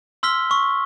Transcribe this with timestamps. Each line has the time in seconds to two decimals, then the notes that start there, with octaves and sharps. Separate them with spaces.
0.23 C6 E6 F6 B6 G7
0.50 C6 C#6